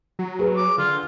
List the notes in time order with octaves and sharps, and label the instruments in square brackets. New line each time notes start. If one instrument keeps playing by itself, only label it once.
[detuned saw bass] F#3
[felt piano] G#4 B4
[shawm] D6
[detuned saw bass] D3 [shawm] F4